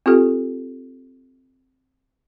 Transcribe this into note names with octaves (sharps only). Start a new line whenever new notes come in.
C4 F4 G4 A4